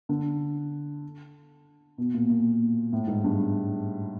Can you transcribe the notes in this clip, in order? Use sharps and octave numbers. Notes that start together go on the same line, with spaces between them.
D3
B2
A#2
A#2
A2
G#2
G2